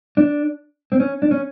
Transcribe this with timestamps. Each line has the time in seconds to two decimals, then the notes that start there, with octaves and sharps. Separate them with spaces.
0.17 D4
0.92 C4
1.00 C#4
1.22 D4
1.31 C#4